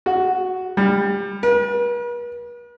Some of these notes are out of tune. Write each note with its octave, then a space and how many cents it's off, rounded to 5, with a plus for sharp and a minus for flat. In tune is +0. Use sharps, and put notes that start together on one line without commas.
F#4 +5
G3 +25
B4 -45